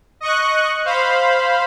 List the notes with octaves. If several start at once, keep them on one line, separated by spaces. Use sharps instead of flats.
D#5 C#6 F#6
C5 F5 B5